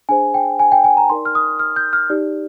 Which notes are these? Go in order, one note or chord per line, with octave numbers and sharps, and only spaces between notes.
D4 G#4 C5 G#5
G5
G#5
G5
G#5
A#5
D#4 A#4 D5 C6
F6
D#6
F6
G6
F6
D#4 G4 D5